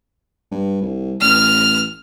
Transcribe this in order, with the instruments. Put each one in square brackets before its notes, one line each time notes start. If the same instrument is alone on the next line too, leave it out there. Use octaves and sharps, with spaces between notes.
[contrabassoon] G2
C2
[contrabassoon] A1 [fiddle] F6